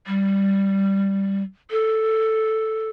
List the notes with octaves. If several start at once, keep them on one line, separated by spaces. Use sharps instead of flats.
G3
A4